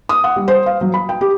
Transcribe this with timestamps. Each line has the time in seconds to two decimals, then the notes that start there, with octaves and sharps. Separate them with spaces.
0.09 D#6
0.24 F#5
0.36 G3
0.48 C5
0.66 F5
0.81 F#3
0.94 B5
1.09 G5
1.21 G4